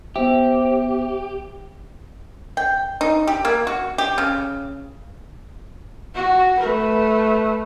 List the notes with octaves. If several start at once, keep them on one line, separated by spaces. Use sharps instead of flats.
B3 G4 C5 E5
G5
D#4
G4
A#3
F#4
G4
C#3
F#4
A3 B4